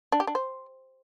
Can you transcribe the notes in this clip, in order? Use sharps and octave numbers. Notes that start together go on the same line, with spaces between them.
D4
G4
D4
C5